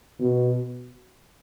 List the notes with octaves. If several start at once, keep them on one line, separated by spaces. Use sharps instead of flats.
B2